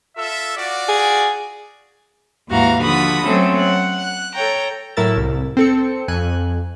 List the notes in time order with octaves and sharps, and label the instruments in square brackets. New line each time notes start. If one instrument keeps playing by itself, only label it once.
[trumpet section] F4 A4 E5
F4 F#4 D5
[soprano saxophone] G#4
[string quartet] D#2 G#2 E3 F#4 F5 A#5
D3 F3 F#4 B5 D#6
F#3 A3 C4 C#4 A4
F#5
F#6
A4 C#5 G5 A#5
[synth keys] A2 F#3 E4 A#4 E6 A6
C2
C4 A4 C#7
F2 G#5 F#6